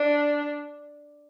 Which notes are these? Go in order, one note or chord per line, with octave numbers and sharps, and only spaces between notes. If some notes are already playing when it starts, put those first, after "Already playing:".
Already playing: D4